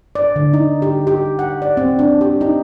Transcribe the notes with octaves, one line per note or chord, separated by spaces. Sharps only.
D5
D3
D#4
G4
G4
F#5
D5
C4
D4
G4
D#4